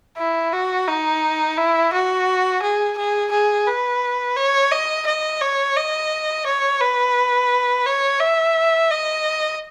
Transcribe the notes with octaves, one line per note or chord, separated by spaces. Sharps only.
E4
F#4
D#4
E4
F#4
G#4
G#4
G#4
B4
C#5
D#5
D#5
C#5
D#5
C#5
B4
C#5
E5
D#5